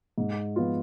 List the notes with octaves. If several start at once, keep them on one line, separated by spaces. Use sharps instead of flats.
G#2
F3 B3 F4